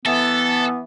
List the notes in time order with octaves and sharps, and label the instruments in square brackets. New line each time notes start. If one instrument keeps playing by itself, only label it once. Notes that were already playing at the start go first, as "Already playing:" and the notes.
[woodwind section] E3 B3 [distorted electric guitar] A4